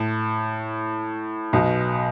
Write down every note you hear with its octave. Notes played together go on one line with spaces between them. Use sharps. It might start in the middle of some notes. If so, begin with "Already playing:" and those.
Already playing: A2
B1 B2